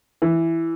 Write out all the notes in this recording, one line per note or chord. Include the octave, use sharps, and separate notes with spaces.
E3